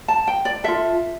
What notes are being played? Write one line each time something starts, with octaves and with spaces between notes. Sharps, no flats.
A5
G5
D5
F4 A4 E5